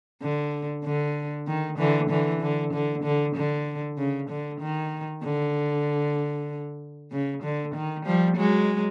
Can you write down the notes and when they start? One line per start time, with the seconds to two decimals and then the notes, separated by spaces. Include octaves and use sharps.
0.22 D3
0.84 D3
1.47 D#3
1.78 D3 E3
2.10 D3 E3
2.41 D3
2.73 D3
3.03 D3
3.35 D3
3.98 C#3
4.30 D3
4.60 D#3
5.24 D3
7.12 C#3
7.43 D3
7.75 D#3
8.06 F3 G3
8.37 F#3 G#3